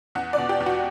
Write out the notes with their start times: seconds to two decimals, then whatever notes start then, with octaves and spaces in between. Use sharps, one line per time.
0.15 E2 F#5
0.33 B2 D5
0.49 G4
0.60 E2
0.66 F#4